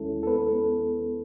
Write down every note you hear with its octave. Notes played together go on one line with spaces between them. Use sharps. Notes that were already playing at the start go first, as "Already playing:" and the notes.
Already playing: D#2 D#3 G#3 C#4 E4 A4
A4
B3 B4